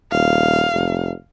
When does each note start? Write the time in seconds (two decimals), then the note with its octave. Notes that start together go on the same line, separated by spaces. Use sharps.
0.12 D#1 F5
0.73 F1